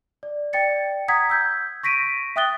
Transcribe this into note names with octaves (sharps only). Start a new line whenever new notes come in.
D5
D5 G5 A6 C#7
F#5 A#5 D#6 G#6 B6
E6 G6 G#6
C#6 A#6 B6 D7 D#7
E5 G5 D#6 F#6 A6 G7